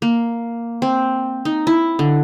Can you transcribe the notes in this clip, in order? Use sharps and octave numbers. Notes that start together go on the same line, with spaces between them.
A#3
C4
D#4
E4
D3